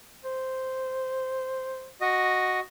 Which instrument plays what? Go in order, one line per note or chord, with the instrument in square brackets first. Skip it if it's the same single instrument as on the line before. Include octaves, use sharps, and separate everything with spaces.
[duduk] C5
[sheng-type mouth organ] F#4 D#5